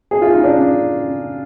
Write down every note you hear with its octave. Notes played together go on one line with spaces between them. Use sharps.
G#4
F4
D#4
D4